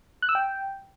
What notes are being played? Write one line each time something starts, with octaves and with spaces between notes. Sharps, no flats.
F#6
E6
G5